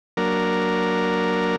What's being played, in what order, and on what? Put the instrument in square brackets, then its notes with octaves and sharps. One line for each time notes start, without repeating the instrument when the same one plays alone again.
[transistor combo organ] F#3 A#3 D4 A#4